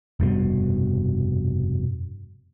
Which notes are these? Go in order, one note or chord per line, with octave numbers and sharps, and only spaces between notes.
F1 G2 B2